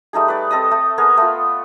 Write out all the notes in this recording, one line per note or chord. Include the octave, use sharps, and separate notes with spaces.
G3 A3 D#4 G#4
B4 D5
C4 A4 D#5 D#6
A3
B3 G#4 A#4 G#5
A3 B3 F4